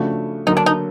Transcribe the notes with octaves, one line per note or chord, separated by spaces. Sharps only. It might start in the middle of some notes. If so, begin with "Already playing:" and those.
Already playing: C#3 F3 A3 D4 F#4
D3 F#3 A#3 D#4
D4
D#4